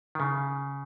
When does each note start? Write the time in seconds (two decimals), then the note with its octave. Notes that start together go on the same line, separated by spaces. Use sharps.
0.15 D#3
0.20 C#3